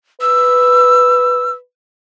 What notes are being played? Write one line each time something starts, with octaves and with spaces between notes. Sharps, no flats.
B4 E6